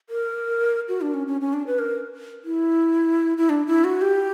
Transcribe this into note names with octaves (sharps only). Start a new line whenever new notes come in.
A#4
F#4
D4
C#4
C#4
C#4
D4
B4
A#4
E4
E4
D4
E4
F#4
G4